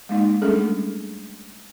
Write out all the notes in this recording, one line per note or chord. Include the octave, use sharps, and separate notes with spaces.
G#3 A#3 D#4
G3 A3 C#4 D4 G#4 A4